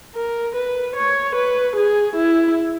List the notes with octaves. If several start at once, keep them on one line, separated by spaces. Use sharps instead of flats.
A#4
B4
C#5
B4
G#4
E4